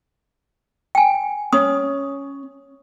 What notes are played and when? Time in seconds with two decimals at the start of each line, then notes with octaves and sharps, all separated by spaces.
0.95 G5 G#5
1.53 C#4 D#6